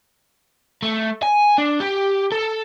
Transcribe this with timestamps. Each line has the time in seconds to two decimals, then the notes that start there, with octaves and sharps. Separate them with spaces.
0.82 A3
1.23 G#5
1.58 D4
1.80 G4
2.32 A4